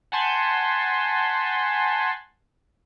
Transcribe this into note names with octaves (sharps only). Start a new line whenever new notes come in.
F#5 G#5 A5 C6 G6 B6